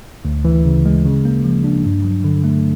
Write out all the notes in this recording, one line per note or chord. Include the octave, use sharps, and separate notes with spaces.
D2
E3
C#3
G#3
C#3
A#3
F3
D4
G2
F#3
D3
A3